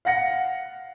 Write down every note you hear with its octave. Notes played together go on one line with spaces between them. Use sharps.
F5 F#5 A#6 C#7